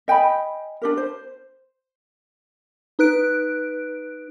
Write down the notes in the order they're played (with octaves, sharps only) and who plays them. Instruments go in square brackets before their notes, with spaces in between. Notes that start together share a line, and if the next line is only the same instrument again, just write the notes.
[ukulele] D#5 G5 G#5 B5
D4 G4 A#4
C5
[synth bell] D#4 B4 F#6 D7